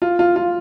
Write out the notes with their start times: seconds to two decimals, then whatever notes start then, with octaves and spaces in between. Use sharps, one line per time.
0.02 F4
0.19 F4
0.36 F4